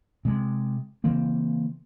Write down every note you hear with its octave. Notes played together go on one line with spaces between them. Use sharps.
C3 G#3
C#3 E3 A#3 C4